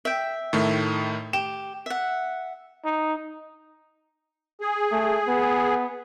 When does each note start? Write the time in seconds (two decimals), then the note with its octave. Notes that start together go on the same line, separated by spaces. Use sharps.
0.05 E5 G5
0.53 A2 D#3 A3
1.33 G4 E7
1.86 E5 F#5
2.85 D#4
4.61 G#4
4.92 A3
5.28 B3